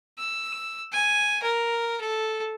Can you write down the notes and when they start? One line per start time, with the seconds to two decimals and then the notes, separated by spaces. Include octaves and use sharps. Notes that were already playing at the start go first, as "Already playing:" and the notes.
0.18 E6
0.92 G#5
1.43 A#4
2.00 A4